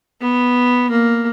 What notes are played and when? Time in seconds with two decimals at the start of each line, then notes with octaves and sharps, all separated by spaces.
0.21 B3
0.90 A#3